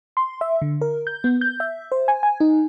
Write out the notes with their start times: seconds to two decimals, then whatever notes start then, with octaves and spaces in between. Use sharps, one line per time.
0.17 C6
0.41 E5
0.62 D3
0.81 A#4
1.07 G6
1.24 B3
1.41 G6
1.60 E5
1.92 C5
2.08 G#5
2.23 G#5
2.40 D#4